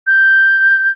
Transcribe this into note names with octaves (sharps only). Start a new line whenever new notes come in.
G6